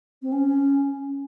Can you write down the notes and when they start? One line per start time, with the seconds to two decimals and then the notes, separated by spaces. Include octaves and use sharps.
0.22 C4
0.32 C#4